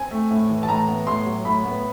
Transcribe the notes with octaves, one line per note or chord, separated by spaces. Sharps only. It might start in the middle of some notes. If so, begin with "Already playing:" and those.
Already playing: C4 G#5
A3
A2
E3
A5
A2 A#5
B3
A2 C6
F#3
A2 B5
B3